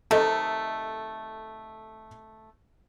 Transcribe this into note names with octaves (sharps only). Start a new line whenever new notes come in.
C3 D#3 A3 A4 D#5